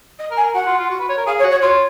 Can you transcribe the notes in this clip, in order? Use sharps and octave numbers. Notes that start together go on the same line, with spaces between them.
D#5
A#4
G#5
A#4
F#4 F#5
F4
F4
F#4
B4
C#5
A#4
G#4 F5
C#5
F#4
C#5
F4 C#5